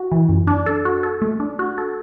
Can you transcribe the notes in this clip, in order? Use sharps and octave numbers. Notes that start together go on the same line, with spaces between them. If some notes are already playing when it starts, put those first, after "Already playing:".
Already playing: F#4
E3
F#2
D4
A4
F#4
A4
A3
D4
F#4
A4